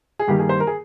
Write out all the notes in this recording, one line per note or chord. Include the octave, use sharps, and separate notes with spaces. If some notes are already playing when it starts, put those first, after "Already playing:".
G#4
G2 D#3 G3 A#3 G4
G#4
C5
A#4
G#4